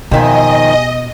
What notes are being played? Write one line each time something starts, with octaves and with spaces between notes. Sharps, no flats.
F2 B2 D#3 G4 D#5 E5 G#5